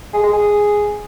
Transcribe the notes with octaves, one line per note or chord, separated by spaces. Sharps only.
G#4
G#3
G#4